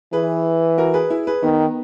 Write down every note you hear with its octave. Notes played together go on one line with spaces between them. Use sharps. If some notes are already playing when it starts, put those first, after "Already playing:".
E3 G#4 B4
F#4 A#4
G#4 B4
E4 G#4
G#4 B4
D#3 B3 D#4